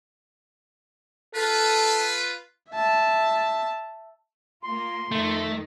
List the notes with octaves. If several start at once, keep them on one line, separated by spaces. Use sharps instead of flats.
F4 A4 B4
E5 A5
A#3 F4 C6
F2 D#3 A3